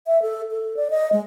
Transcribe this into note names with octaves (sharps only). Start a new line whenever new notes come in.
E5
A4
A4
D5
D#5
G#3